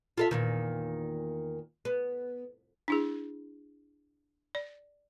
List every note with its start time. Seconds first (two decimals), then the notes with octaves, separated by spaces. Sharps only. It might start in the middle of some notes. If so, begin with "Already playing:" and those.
0.18 F4 A4 E5
0.31 E2 A#2 D#3
1.85 B3
2.88 D4 E4 G#4
4.55 D5